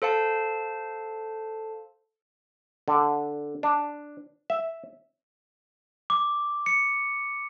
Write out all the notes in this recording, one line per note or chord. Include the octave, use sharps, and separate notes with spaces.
A4 C5 F5 A5
D3
D4
E5
D6
C#7